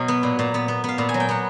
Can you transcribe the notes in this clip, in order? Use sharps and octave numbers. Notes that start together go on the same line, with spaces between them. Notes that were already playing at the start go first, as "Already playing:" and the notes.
Already playing: B2 F#3
B3
A#2
A#2
B3
B3
B3 F5
A#2
G#5
F#3
G5
B3 F#5